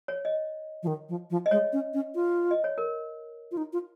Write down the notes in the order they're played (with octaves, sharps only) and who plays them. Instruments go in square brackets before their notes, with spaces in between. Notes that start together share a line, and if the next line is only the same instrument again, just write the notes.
[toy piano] C#5
D#5
[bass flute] F3
D#3
F3
F3
[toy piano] D#5
[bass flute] G#3 [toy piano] C#5
[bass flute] C#4
C#4
F4
[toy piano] D#5
C#5
A#4
[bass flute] F4
D#4
F4